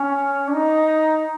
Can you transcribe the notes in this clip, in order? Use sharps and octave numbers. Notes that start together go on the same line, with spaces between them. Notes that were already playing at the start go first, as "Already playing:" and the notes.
Already playing: C#4
D4
D#4